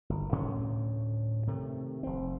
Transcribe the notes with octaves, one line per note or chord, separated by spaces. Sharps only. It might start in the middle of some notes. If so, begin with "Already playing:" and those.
G1
D2 A2 C#4
C3 D#3 A3
F1 C4